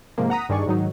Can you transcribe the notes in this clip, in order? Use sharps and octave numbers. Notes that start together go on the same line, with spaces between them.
G#2 C3 F3 A#3
F#5 A#5 D#6 B6
G2 D#3 D4 G#4 D5 C#6
G#2 D#3 F#3 D#4